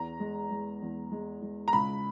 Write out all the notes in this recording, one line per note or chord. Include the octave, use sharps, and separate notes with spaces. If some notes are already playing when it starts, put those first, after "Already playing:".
Already playing: E2 A#5
G#3
G#3
E2
G#3
G#3
A#5
C#2 B5